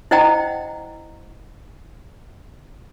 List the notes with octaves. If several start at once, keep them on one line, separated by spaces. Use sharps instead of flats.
E4 C5 D#5 F#5 G5 A#5